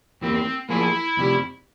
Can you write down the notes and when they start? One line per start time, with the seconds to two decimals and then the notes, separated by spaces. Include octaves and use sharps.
0.21 E2 E3 A#3 C4
0.69 F3 A#3 E4 F4 G#4
1.17 F2 C3 G3